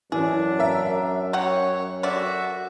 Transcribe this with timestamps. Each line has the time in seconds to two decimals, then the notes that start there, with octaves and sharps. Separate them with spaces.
0.12 F#2 E3 D4 G#4
0.59 A#4 E5
1.33 F#3 G4 C#5 F#5
2.03 D3 F#4 G4 D5 E5